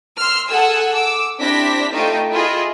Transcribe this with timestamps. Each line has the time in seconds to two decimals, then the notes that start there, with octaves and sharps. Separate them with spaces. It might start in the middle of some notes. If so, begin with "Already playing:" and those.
0.18 C6 E6 F6
0.49 G#4 A4 F#5 G#5 E6
0.93 D6 E6
1.39 C4 D4 E4 G4 A#6 B6
1.92 A3 D#4 F4 D#5 G5
2.31 E4 F4 G#4 D#5